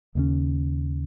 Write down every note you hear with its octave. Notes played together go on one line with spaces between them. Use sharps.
D#2 C#3 G#3 C#4